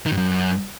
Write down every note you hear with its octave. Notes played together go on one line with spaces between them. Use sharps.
D#3
G2
F#2